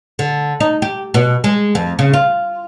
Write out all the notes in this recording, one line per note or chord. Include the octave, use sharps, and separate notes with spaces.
D3
D#4
G4
B2
G#3
F2
C#3
F4